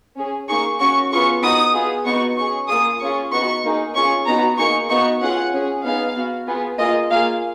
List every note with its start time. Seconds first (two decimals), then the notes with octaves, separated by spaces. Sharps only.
0.17 C#4 G#4
0.48 A#3 D#4 G#4 C#6
0.80 C#4 F#4 C#6
1.12 B3 F4 G#4 C#6
1.42 B3 D#4 F#4 D#6
1.74 B3 F4 G#4
2.06 B3 D#4 F#4 C#6
2.38 C#4 G#4 C#6
2.68 A#3 F4 G#4 D#6
3.00 C#4 F4 G#4 C#6
3.32 B3 D#4 F#4 C#6
3.64 A#3 D#4 G#4
3.95 C#4 F4 G#4 C#6
4.27 B3 D#4 F#4 A#5
4.58 A#3 D#4 G#4 C#6
4.89 B3 D#4 F#4 C#6
5.21 C#4 F4 G#4 F#5
5.52 C#4 G#4
5.84 B3 D#4 G#4 F5
6.16 B3 F#4
6.47 B3 F4 G#4
6.78 A#3 F4 G#4 D#5
7.10 A#3 F4 G#4 F5